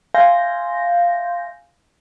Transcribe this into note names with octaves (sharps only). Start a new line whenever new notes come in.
E5 F5 G#5 C6 G6 A#6